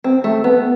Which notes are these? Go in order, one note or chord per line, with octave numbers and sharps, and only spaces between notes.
C4
A3
B3